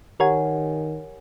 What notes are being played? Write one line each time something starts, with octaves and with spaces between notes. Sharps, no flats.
D#3 G4 A#4 C#5 F#5 G#5